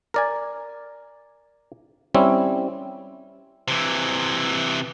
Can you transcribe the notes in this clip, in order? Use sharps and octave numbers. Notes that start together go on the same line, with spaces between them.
A#4 D5 G#5
G3 C4 C#4 E4
C3 E3